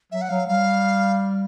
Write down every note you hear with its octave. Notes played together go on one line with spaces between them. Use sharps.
F#3 E5
F#5
F#3 F5
G3 F5